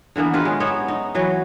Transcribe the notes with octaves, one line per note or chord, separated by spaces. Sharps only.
D3 E3 A#3 B3
D#3 F4 G4 B4
G#3 C#4
B3 D#4 C#5 E5
D#4
E3 F#3 B4 C#5